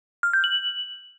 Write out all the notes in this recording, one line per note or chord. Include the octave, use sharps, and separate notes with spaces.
F6
G6
F#7